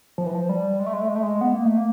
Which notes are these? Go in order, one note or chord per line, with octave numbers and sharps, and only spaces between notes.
F3
E3
F3
G3
G#3
A3
G#3
A3
G#3
A3
G#3
B3
A#3
A3
A#3